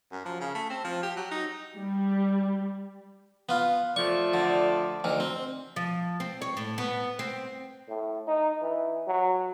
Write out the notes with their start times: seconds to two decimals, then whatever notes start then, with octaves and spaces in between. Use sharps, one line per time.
0.12 F#2
0.25 F3
0.40 C#3
0.54 A3
0.70 C4
0.84 F3
1.03 G4
1.17 F#3
1.31 D#4
1.77 G3
3.49 B3 F4
3.96 F3 A3 D5 C#6
4.34 D3
5.04 D2 D#3
5.20 C4
5.76 F3
6.20 C4
6.42 C#5
6.57 A2
6.78 B3
7.19 C4
7.89 A2
8.28 D#4
8.62 E3
9.07 F#3